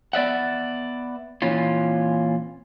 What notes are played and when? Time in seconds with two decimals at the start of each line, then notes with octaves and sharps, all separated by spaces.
0.13 B3 D5 E5 F#5
1.42 A#2 E3 C4 C#4 F4